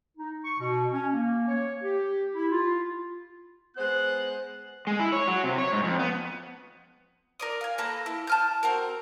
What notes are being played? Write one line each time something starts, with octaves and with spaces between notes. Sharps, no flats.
D#4
C#6
B2
C#4
A#3
C#5
G4
E4
F4
G#3 B3 C5 F#6
G#3
E4
C#5
F#3
C3
C#5
G#2
F2
B3
A#4 D5 D#6
F5 G#5
A#3 A4 B4 A#5
E4
A5 F6 G6
C4 F#4 A#4